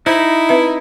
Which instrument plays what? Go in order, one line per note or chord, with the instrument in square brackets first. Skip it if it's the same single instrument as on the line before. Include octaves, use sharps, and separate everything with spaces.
[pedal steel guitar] D#4 [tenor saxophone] E4 [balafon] C5
[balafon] C4 B4 E5